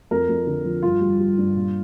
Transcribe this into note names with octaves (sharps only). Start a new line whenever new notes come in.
F2 A#4
F2
D3
F3
G2 F4
G3
G3
G2
A#2